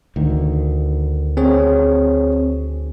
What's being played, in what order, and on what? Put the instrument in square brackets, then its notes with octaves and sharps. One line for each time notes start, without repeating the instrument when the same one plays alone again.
[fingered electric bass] D2 D#3
[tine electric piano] C4 G#4 C#5